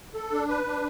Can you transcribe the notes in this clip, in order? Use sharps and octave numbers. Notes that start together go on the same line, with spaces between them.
A4
D4
B4
D4